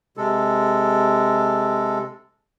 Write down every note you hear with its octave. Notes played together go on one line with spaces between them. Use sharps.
C3 G#3 A4